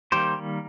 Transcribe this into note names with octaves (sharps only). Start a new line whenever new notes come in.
D#3 G3 A#3 G4 C5